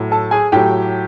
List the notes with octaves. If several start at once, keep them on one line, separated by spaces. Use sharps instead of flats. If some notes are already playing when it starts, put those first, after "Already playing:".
Already playing: A2 F#3
A4 A5
G#4 G#5
A2 F#3 G4 G5